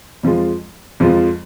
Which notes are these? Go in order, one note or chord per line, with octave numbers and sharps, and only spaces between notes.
F2 F3 G#3 F4
F2 F3 G#3 F4